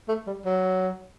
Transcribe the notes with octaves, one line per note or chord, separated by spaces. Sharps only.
A3
G3
F#3